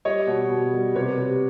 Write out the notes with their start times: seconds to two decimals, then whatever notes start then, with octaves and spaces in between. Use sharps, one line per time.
0.05 G3 C#5 D#5
0.27 B2
0.50 B2
0.73 G3
0.95 C3 B4 C#5
1.18 C3